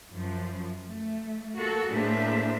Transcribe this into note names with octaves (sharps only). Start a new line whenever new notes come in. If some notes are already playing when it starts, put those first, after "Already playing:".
F#2 F3
A3
A#3 F#4 A4
A2 A#3 D4 G#4 C5 E5